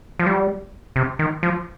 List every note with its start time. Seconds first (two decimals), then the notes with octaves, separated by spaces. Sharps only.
0.19 F3
0.26 G3
0.96 C3
1.19 D#3
1.43 F3